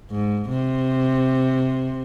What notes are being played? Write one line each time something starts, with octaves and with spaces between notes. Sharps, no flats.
G#2
C3